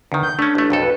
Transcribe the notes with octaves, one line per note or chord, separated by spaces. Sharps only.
E2 D3 D#3
G6
A3 C#4 D4
A1 A3
B1 F2 A4
B4